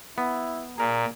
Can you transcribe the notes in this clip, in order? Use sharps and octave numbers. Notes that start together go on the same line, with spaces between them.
B3 E4
A#2 G#4 A#4 A#5